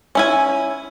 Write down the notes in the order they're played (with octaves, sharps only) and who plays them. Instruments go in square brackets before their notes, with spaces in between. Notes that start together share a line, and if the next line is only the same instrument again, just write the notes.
[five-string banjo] C#4 E4 G#5